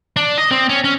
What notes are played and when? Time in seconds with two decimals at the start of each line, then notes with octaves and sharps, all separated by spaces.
0.17 D4
0.38 D#5
0.51 C4
0.69 C#4
0.84 C#4